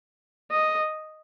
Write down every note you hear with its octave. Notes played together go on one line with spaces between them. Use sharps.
D#5